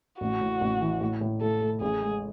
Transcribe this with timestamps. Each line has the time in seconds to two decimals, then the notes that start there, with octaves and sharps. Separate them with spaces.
0.21 A1 F#4
0.41 A2
0.61 A1
0.81 E3
1.01 A2
1.21 A2
1.41 A2 A4
1.61 A3
1.81 A1 G#4
2.02 G#3